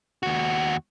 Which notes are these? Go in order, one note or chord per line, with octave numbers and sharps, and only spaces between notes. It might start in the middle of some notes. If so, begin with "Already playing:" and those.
D#2 F#4